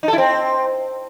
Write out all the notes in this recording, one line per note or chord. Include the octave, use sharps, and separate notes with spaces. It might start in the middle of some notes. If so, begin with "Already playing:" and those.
D#4
A4
E4
C4